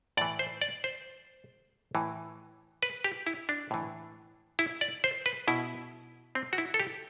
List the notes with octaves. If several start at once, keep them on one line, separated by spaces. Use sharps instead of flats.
A2 E3 D5
C5
D5
C5
A2 E3
B4
G4
E4
D4
A2 E3
E4
D5
C5
B4
B2 E4
C4
F#4
E4
A4
G4